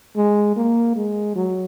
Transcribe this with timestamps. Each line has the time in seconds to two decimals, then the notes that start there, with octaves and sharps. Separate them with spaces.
0.17 G#3
0.56 A#3
0.96 G#3
1.36 F#3